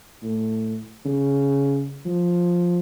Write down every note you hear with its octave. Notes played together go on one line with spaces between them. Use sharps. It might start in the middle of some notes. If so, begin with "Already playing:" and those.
A2
C#3
F3